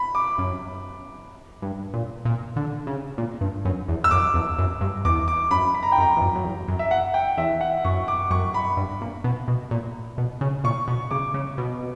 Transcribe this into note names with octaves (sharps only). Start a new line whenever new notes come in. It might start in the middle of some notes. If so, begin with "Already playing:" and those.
Already playing: B5
D6
F#2
G2
A#2
A#2
D3
C#3
A#2
G2
F#2
E2
E6
F#2 D6
E2
F#2
G2
E2 D6
D6
F#2 B5
B5
A#5
G5
F#2 A#5
E2
F#2
F#2
E2
F#2
E5
F#5
G5
E2 E5
F#5
F#2 C#6
D6
F#2 C#6
B5
G2
A#2
B2
B2
A#2
B2
C#3
A#2 C#6
B2
C#3 D6
C#3
B2